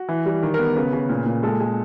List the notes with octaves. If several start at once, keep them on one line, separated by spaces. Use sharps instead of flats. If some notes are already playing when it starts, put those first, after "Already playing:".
Already playing: F#4
E3
G3
D#3
B3 A#4
C#3 B4
C#3
A#2
A#2
G#3 A4
G#3